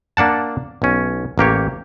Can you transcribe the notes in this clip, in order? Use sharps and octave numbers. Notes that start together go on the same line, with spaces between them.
A#3 D4 F#5 A5
B1 C#4
A1 A#3 G4 C#5